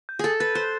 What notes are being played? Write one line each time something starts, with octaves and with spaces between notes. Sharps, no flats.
G6
G#4 A4 A6
B4 A6
C5 F#6